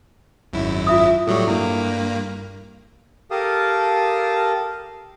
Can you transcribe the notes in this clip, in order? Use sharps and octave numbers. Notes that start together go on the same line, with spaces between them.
G#1 F#2 E4
F4 E5 D#6
A2 F#3 G3 A4 C#6
G2 A#3 E4
G4 A4 A#4 F5 A5 D#6